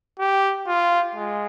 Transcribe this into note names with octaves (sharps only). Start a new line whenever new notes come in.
G4
F4
G#3